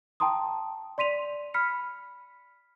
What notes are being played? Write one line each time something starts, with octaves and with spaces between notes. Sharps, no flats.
G5 A5 A#5 C6 D#6
D5 C6 B6 D#7 F7
B5 F6 B6 C#7